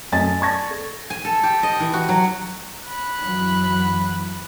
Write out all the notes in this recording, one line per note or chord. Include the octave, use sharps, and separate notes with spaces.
F#2 A3 D#5 G#5 A6
D5 A5 C#6 G#6 A#6
A4
G#5
A4
G4
D#5
E3
F#4
F#3
B5 F#6
F#2 E3 F#3